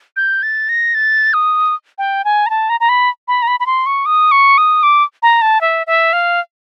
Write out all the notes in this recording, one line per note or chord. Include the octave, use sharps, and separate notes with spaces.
G6
A6
A#6
A6
D#6
G5
G#5
A#5
A5
A#5
A#5
B5
B5
A#5
B5
B5
C6
C#6
D#6
C#6
D#6
D6
A#5
A5
E5
E5
F5